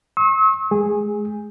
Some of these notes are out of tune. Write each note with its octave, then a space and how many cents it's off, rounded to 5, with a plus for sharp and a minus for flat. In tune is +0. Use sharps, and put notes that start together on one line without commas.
C#6 -45 E6 -40
G#3 +35 G#4 -10